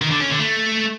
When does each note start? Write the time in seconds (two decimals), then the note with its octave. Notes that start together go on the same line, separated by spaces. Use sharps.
0.02 D#3
0.11 D3
0.20 C#4
0.30 D3
0.39 A3